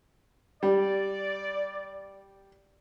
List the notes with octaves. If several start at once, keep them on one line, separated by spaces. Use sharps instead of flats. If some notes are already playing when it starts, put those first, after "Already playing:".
G3 D5